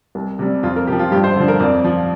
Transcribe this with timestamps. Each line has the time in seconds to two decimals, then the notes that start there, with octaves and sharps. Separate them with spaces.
0.15 C2
0.39 C3 G3
0.63 F2 F4
0.76 A#4
0.87 C3 F3 G4
0.99 F4
1.11 G2 G4
1.24 C5
1.36 D3 F3
1.48 A#4
1.60 F2 D5
1.84 F3